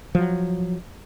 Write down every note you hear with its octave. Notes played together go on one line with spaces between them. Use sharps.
F3 F#3